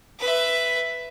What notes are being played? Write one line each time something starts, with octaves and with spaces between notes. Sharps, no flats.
B4 E5